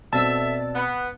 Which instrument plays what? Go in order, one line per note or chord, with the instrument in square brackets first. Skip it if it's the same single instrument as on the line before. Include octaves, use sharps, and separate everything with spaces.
[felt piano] B2 C4 F#4 [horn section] A4 E5 [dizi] D5 [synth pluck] A5 E6
[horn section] B3